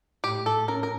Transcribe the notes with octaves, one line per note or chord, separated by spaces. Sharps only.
A2 G4
A4
C#4 A#4
A#4